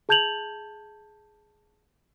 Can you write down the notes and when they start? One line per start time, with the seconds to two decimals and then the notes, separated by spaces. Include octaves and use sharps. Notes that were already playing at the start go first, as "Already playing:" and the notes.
0.09 G#4 A5 G6 G#6 F7 F#7